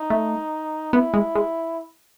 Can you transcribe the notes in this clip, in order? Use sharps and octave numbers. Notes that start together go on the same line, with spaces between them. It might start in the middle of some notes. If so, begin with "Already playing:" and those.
Already playing: D#4
A3
B3 E4
G#3
G#3